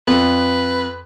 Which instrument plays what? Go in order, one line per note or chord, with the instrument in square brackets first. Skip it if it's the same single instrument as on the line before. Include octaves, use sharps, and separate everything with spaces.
[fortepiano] F2 [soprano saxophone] B4